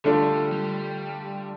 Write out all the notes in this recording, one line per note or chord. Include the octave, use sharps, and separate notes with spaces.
D3 G3 A3 D4 F4 A4
G3